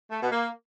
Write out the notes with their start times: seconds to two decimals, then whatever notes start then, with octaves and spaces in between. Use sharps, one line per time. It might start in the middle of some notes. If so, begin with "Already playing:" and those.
0.11 A3
0.21 B2
0.31 A#3